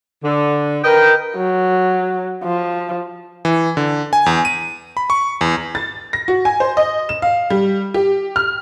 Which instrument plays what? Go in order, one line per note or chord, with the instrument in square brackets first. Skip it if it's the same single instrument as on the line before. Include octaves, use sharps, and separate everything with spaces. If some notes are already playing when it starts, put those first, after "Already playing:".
[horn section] D3
A#4 B4 D#5 G5
[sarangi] F#3
F3
[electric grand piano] E3
D3
G#5
E2
D#7
B5
C#6
E2
[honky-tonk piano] A6
A#6
F#4
G#5
C5
D#5
E7
F5
G3
G4
F6